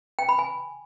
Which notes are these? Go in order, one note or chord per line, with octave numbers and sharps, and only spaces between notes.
G5
B5
G#5